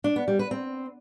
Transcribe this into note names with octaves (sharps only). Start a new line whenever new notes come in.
D4
B3
G3
B4
C4